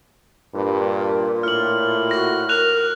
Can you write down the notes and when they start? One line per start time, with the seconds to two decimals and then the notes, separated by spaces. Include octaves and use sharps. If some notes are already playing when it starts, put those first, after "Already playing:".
0.55 G2 A#2
0.90 A#4
1.43 A2 F4 F6 F#7
2.11 F#4 A#6
2.49 A#4 F#6 F7